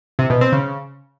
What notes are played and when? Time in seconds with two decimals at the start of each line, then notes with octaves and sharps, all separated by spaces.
0.19 C3
0.30 B2
0.41 C4
0.52 C#3